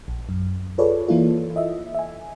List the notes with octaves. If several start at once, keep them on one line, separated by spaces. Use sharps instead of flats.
A#1
F#2
F4 G#4 A4 B4 C#5 D5
E3 A#3 E4 F4 A4
D#5 E5
E5 G#5